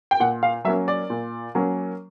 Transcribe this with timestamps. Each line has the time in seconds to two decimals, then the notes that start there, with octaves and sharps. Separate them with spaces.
0.11 G5
0.20 A#2 F#5
0.43 F5
0.64 F#3 E5
0.68 A#3 C#4
0.88 D5
1.10 A#2
1.55 F#3 A#3 C#4